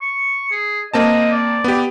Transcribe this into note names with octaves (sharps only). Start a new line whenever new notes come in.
C#6
G#4
A#3 C4 D#5 A5
D5
B3 G4